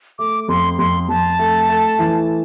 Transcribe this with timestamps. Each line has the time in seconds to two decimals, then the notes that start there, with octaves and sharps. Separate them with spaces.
0.19 A3 D6
0.48 F2 C6
0.79 F2 C6
1.09 F2 A5
1.39 A3
1.69 A3
1.99 E3